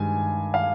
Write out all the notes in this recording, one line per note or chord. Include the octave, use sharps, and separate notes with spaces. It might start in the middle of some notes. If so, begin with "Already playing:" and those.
Already playing: G2 D#3 G#3 G#5
F5